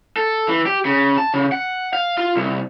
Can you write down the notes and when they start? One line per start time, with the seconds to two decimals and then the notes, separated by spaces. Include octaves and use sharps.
0.16 A4
0.48 E3
0.66 G4
0.85 C#3
1.18 A5
1.34 C#3
1.52 F#5
1.93 F5
2.17 F4
2.36 C2